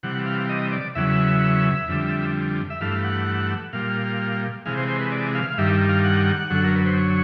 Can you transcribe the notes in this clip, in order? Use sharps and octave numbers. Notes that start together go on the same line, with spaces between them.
C3 E3 G3 F#5
F5
D#5
D5
E2 C#3 F#3 E5
F2 D3 G3
E5
G2 E3 A3 F5
F#5
A#2 G3 F5
C3 E3 G#3 F5
C5
C5
B4
D5
F5
F5
G2 D#3 G3 E5
F5
F#5
F#2 D3 F#3 A4
A#4
B4
C5
C#5